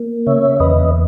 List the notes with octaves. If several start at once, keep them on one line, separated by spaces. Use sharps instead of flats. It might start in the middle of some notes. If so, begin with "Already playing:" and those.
Already playing: A#3
C#3 C#5 E5
E2 B4 D#5